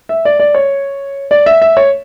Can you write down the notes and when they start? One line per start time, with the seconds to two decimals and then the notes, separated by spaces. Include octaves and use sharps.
0.09 E5
0.25 D5
0.40 D5
0.55 C#5
1.31 D5
1.46 E5
1.62 E5
1.77 C#5